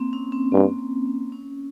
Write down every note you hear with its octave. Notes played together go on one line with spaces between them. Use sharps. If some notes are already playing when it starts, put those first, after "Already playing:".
Already playing: A#3 C4
C#4
C4
G2 A#3
A#3
C4
C#4